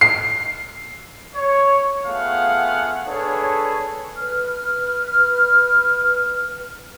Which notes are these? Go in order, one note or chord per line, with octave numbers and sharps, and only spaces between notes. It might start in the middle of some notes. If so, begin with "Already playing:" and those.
C7
C#5
A3 B3 F4 G#4 F5 F#5
D4 G#4 A4 B4 C#5
B4 F6